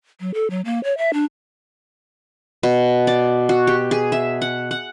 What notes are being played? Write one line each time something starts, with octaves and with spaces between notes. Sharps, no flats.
F#3
A4
F#3
A#3
C#5
E5
D4
B2
D5
F#4
G4
G#4
E5
F#5
F#5